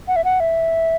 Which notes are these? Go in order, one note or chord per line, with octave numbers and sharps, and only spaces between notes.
F#5
E5
F#5
E5